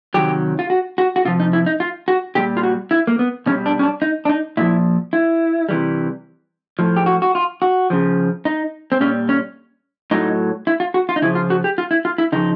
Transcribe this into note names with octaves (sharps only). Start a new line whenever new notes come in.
C3 D#3 F#3 G4
F4
F#4
F#4
F#4
C3 F3 F4
D#4
E4
D#4
F4
F#4
A#2 G3 G4
F4
F#4
E4
A#3
B3
B2 G3 C#4
D4
C#4
D4
D#4
D4
D#4
A#2 F3 E4
E4
C3 E3 G3
A2 F3
G4
F#4
F#4
F4
F#4
C#3 F3
D#4
C4
A#2 G3 C#4
C#4
A2 F#3 D#4
E4
F4
F#4
F4
D#4
C#3 F3 E4
F4
F#4
G4
F4
E4
F4
E4
C#3 F3 D#4